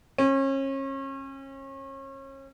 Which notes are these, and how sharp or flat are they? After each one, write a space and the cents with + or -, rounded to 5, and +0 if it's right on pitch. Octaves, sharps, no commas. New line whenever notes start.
C#4 -35